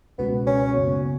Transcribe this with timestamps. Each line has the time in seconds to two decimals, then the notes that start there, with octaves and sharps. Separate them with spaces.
0.19 C#2 B2 G#3 B3 C#4 F#4
0.47 C#4
0.74 F#2 C#3 B3 F#4